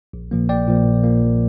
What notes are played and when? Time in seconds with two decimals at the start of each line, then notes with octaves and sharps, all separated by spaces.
0.13 A#1
0.31 A#2 F3 A#3
0.49 A#1 D5 G5
0.68 A#2 F3 A#3
0.86 A#1
1.03 A#2 F3 A#3
1.22 A#1